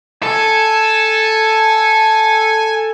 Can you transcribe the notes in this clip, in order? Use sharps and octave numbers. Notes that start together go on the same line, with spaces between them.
A4 G#5